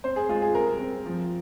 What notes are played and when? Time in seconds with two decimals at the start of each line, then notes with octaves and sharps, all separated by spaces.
0.04 C4 C5
0.16 G#4
0.29 G#3 F4
0.42 G#4
0.54 C3 A#4
0.80 C4
1.06 F3